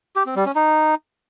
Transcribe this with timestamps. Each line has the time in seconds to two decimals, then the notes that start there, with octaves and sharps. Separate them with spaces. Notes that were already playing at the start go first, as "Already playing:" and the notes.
0.16 G4
0.26 C4
0.36 G3
0.46 C#4
0.55 D#4